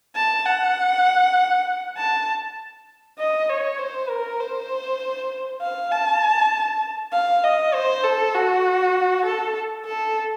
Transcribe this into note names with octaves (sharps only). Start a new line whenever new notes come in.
A5
F#5
A5
D#5
C#5
C5
A#4
C5
F5
A5
F5
D#5
C5
A4
F#4
A4
A4